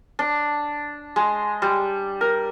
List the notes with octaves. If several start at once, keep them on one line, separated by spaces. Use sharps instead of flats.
D4
G#3
G3
A#4